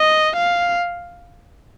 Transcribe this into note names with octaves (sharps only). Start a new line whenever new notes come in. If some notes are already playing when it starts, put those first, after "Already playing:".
Already playing: D#5
F5